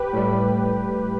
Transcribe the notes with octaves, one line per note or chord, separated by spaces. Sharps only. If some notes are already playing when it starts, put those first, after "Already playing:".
Already playing: G4 B4
A2 G3